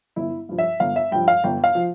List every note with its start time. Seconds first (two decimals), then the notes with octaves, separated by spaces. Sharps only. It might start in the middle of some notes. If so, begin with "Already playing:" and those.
0.16 G1 E4
0.49 G2 F3
0.58 E5
0.80 G1 F5
0.96 E5
1.11 G2 F3 G5
1.28 F5
1.44 G1 G5
1.64 F5
1.75 F3